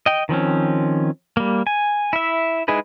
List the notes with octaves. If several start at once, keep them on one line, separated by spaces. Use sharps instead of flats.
D#5 G5
D#3 F3 C4 C#4
G3 A#3
G#5
E4 E5
G#3 D#4 E4 G#4 B4